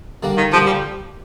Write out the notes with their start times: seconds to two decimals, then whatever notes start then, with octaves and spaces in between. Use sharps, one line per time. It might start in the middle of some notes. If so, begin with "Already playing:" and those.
0.23 D3 G3 A#3 D4
0.37 D#3
0.51 D3 F3 G3 A#3 D4
0.66 G3